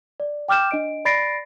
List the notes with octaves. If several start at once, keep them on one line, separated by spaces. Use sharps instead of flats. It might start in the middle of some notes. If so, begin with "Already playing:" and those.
D5
G5 D6 F6 G6 E7
D4 D#5 D7
D5 B5 A6 A#6 C7 D7